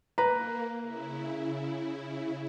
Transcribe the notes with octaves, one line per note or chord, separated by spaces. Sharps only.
A#3 B4 A#5
C#3 E4